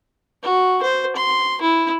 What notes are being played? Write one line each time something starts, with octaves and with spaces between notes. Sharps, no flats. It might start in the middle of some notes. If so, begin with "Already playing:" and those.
F#4
C5
C6
E4